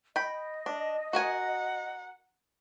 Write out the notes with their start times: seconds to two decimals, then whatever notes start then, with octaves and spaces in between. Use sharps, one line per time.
0.16 D#5 G5 B5
0.66 D4
1.13 F#4 A#4 F#5 G#5